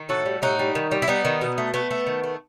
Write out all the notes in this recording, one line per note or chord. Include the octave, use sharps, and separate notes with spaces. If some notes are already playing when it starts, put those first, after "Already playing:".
Already playing: D#3
A2 F#4 A4
G3
A2 D#4 F#4
G3
D#3
G3
E4
G3 B3 D#4
D#3
B2
A3
A3 B3
A3
D#3
A3